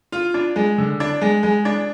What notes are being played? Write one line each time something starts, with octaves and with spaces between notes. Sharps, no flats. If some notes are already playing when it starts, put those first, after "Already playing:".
F4
D4
G#3
D3
D4
G#3
G#3
D4